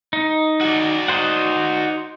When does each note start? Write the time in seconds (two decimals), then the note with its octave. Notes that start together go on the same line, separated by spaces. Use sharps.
0.13 D#4
0.61 F#4 D5
1.08 D#4 C5 F#5